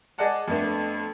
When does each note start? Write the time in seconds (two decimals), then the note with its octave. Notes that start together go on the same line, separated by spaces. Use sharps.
0.18 G#4 D5 D#5 F#5 A5
0.48 F2 A3 B3 D4